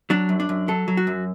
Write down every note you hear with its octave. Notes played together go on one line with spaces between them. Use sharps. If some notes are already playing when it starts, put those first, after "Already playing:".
F#3 D4
F#2
D4
F#2
F#3 A4
F#3
F#4
F#2